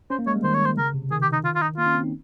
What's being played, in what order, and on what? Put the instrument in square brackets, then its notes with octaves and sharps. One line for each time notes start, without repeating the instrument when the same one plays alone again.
[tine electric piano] C#4 [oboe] C5
[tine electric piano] A#3
[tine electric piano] G#3 [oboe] C#5
[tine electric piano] G3
[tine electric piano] D#3 [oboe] C5
[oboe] C#5
C5
[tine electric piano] C#3 [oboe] A#4
[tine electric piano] C3
[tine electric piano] D#3 [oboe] G#4
[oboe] G4
D#4
F4
F4
D#4
[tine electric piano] A#3 [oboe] F4
[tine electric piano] C#4
C4
D#4